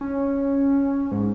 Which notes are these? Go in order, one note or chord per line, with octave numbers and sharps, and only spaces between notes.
C#4
G#2